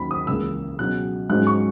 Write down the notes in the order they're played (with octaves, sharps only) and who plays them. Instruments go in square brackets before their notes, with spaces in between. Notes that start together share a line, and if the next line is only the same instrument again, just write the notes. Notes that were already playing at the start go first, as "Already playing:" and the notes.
Already playing: [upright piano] D#2 D#3 F#3 C#4 B5
D#6
C#2 C#3 E3 A#3 E6
B2 F#3 C#4 F#6
G#2 F#3 C#4 F#6
C#6